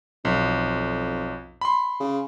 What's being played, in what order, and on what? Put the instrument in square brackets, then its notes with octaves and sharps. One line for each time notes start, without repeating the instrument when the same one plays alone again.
[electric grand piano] B1 [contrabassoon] F2
[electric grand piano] B5 C6
[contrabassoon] C#3